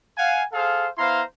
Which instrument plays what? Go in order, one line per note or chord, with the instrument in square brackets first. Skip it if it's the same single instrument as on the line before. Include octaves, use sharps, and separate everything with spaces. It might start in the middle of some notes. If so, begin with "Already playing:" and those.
[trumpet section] F5 F#5 G#5
G#4 A4 C5 F5
B3 E4 C5 F5 A#5 C6